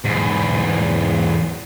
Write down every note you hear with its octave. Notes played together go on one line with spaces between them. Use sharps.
E2 G#2